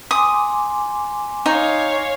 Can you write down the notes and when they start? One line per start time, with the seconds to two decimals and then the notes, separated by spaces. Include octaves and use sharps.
0.11 G#5 C6 D6 D#6
1.46 D#4 C#5 F5